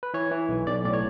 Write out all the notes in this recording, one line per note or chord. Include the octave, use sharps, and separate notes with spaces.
B4
E3 C#5
E3
B1
B1 D5
A2 D5
C#5